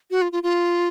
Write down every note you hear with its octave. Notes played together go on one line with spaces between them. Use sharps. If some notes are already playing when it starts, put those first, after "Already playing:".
F#4
F4
F4
F4